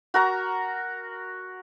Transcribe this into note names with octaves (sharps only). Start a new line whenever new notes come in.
F#4 A#4 A#5